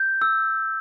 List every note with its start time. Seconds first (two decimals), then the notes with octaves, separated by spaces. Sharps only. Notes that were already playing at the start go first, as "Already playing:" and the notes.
Already playing: G6
0.22 E6